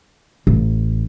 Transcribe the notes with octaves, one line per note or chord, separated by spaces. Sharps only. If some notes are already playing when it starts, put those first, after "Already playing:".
A1